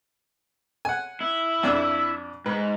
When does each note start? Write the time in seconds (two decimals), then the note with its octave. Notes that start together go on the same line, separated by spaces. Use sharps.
0.85 F#5 G#5
1.21 E4
1.63 F2 D4 E6
2.46 G#2 B4